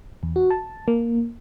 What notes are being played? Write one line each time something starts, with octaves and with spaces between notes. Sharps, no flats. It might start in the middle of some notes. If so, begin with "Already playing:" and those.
E2
F#4
A5
A#3